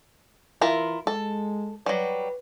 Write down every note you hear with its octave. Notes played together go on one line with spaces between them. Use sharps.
E3 E4 F4 A#4
G#3 A4
F#3 G3 B4